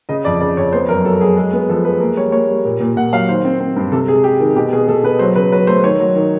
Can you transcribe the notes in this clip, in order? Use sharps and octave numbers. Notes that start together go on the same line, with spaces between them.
C#3 D#5
F2 D5
C#3 D5
F2 C#5
B3 C5
F#2 A#4
F#3 A4
F#3 G#4
G#3
B3
F3 A4
G#3 B4
A#3
G3 C#5
A#3 C#5
G3
A#2
A#2
A#2 F#5
F#3 F5
D#3 C5
C4
C4
G2
C3 A4
G#3 G#4
G#3 G4
D#3 G#4
B2 G4
B2 G#4
B2 A4
B2 B4
F#3 C5
C#3 B4
F#3 B4
A3 C5
D#3 C#5
F#3
D#3